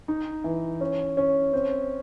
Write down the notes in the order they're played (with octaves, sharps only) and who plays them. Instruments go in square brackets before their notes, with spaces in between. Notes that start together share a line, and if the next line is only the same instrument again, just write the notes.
[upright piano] D#4
E3
C#4
C#4
C4